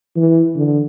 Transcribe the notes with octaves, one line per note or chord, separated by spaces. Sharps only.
E3
D3